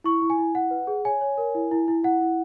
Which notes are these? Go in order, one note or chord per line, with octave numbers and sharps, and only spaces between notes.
E4 C#6
E4
G#5
E4
E4 F#5
B4
G#4
C#5 G#5
C#5
A#4
E4
E4
E4
E4 F#5
E4